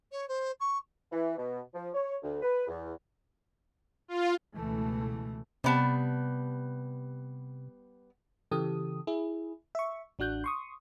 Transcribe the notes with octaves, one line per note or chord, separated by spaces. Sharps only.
C#5
C5
C#6
E3
B2
F3
C#5
D2
B4
E2
F4
C#2 B2 E3 A3
C3 G3 B3 A5
C#3 E3 G4 A4 D#6
E4 G#4
E5 C#6
A1 D4 F#4 F#6 G6
C6 C#6 D#6